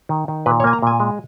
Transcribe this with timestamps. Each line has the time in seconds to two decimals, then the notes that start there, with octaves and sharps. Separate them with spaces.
0.09 D#3
0.28 D#3
0.46 A#2 B4
0.60 C#5
0.64 A#3 G#5
0.73 A#5
0.82 A#2 G#5
1.00 G#3